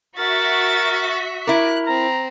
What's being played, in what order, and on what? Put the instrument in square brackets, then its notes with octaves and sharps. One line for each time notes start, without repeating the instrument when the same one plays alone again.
[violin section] F#4 E5 B6 [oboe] A#4 [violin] A6
[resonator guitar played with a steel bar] E4 A#4 [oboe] D6 [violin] F#6
[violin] C4 [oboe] A#5